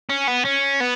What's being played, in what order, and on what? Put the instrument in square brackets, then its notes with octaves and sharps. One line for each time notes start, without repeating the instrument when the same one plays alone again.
[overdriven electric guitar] C#4
B3
C#4
B3